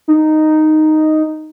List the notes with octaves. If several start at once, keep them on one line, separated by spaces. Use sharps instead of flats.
D#4